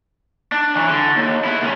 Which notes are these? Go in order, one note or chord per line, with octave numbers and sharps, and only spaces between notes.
D4
E3 F#3
D3
D#2
B3 E4
C2 C#4